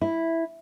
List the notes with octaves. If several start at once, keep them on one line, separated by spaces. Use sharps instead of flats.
E4